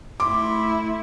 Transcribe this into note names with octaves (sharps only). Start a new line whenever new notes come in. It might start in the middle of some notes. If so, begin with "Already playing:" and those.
A3 E4 C6 D6